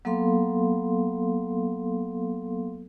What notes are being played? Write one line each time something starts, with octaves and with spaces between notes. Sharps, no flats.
F#3 A#3 B3 A4 F5 C6